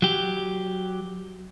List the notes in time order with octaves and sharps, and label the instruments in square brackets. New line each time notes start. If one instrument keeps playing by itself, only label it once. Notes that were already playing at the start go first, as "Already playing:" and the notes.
[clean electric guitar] F#3 G4